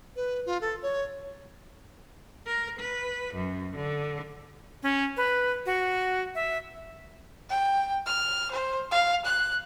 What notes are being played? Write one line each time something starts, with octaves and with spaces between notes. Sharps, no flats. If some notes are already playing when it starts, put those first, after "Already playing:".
B4
F4
A4
C#5
A#4
B4
F#2
D3
C#4
B4
F#4
E5
G5
F6
C5
F5
F#6